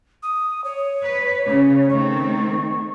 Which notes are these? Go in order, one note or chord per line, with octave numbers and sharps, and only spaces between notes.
D#6
C#5
B4
C#3
D#3 A3 C4 C#6